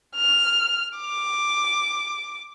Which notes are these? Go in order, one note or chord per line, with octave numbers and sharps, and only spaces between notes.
F6
D6